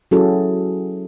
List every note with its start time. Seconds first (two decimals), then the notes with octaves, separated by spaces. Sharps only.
0.11 F#3 C#4 E4 F#4 G#4 A4